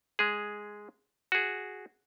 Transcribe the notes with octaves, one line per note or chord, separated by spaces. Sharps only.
G#3 G#4
F#4 G#4